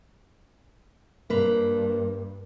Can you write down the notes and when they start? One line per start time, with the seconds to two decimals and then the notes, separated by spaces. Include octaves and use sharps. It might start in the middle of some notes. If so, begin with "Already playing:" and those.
1.30 G2 A#3 B4 C5